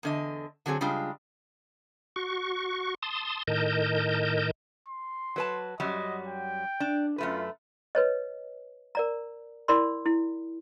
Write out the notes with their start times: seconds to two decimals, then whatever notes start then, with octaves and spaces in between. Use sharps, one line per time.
0.03 E2 D3 D#5
0.66 D3 F#3 C4 G#4
0.81 C#3 G3 G#3 D4 F4
2.16 F#4 C#6
3.03 A5 C6 D#6
3.47 A2 D#3 A#4 D#5 A5 G6
4.89 C6
5.36 F#3 B4 A5
5.80 F#2 F#3 G3 D#5
6.28 G5
6.80 D4
7.18 F#2 A3 F4 B4
7.95 B4 C#5 D#5
8.95 A#4 D5 A#5
9.68 E4 A#4 D5 B5 C6
10.06 E4